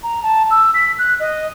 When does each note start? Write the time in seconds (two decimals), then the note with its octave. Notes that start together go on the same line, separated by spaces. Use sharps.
0.03 A#5
0.23 A5
0.51 E6
0.74 B6
0.99 F#6
1.20 D#5